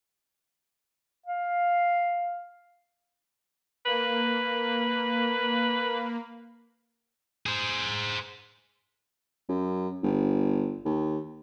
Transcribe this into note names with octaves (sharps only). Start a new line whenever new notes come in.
F5
A#3 B4
G#4 C5
F#2
G1
D#2